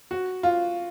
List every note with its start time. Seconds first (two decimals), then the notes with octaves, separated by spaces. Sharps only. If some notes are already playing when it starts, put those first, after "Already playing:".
0.11 F#4
0.43 F4